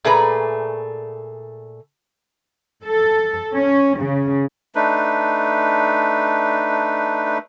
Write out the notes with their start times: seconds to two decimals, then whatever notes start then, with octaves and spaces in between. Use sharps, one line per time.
0.04 A#2 A3 G#4 B4 A#5
2.84 A4
3.52 C#4
3.98 C#3
4.75 A3 D4 D#4 B4